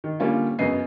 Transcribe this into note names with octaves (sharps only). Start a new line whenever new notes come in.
D#3
D3 G3 A#3 C#4 F4
F#2 C#3 B3 D#5 C7